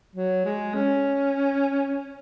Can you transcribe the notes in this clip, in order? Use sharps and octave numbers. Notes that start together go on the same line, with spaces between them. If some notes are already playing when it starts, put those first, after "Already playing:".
F#3
G#3
C#4